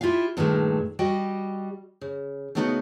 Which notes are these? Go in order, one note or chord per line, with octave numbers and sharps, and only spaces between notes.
E4 F4 G4 E5 F5
G2 A#2 D#3 E3 G#3 A3
G3 F#4 D#5 G5
C#3
C#3 A3 B3 D#4 F4 F#4